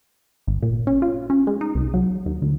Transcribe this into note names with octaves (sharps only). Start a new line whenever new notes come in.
G#1
A#2
C#4
F4
C#4
G#3
D#4
C2
F#3
D#2
D2